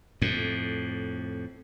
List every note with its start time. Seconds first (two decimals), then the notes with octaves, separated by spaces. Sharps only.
0.22 F2 A2